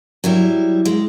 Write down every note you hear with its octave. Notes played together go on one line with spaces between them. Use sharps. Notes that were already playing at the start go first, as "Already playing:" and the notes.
F#3 G3 E4
G#3